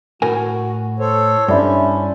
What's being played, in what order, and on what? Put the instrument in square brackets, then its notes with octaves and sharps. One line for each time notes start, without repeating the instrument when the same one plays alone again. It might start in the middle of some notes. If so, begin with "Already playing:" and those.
[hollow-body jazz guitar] A2 A#4 G#5 [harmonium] F#4
[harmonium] A4 C5 C#5
[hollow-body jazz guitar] G2 [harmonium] C#4 [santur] D4 E4 C5